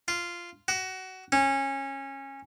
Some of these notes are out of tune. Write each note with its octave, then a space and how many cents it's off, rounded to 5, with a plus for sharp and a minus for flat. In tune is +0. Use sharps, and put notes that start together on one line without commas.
F4 -10
F#4 +20
C#4 -20